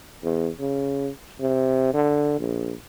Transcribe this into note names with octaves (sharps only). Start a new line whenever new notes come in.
E2
C#3
C3
D3
A#1